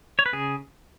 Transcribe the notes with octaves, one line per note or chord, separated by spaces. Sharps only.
C#5
B4
C#3 G#4